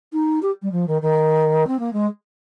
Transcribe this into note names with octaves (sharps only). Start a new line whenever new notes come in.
D#4
G4
G3
F3
D#3
D#3
C4
A#3
G#3